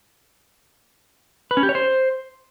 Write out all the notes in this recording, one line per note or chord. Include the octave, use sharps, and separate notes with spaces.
B4
C#4
G4
C#5
C5